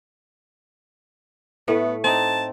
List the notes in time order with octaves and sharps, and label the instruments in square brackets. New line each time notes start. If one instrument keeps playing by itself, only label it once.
[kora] A2 A3 [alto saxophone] B3
[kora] C4 D#4 [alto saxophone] A5